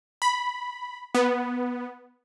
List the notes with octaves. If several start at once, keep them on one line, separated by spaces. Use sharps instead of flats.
B5
B3